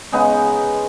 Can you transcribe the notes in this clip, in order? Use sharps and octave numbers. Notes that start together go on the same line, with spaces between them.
C#3 G#3 B3 D#4